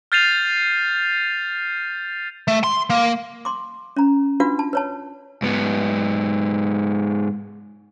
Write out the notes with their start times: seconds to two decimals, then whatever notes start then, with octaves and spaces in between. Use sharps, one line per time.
0.12 F6 G6 A6 C7 D#7 F7
2.48 A3
2.64 C6
2.90 A#3
3.45 C6 D6
3.96 C#4 A#5
4.40 D4 F4 F#4 B4 F#5
4.59 A5
4.73 B4 C#5 A5
5.42 G#2 B3